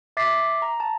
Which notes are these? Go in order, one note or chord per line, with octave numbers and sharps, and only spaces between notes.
E5 D6 A6 B6 C7
A#5
A5